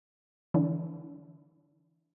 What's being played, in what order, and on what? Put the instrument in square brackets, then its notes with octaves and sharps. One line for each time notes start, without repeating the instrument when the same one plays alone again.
[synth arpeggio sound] D3 E3